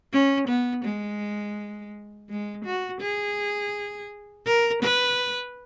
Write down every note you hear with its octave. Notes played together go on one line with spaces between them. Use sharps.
C#4
B3
G#3
G#3
F#4
G#4
A#4
B4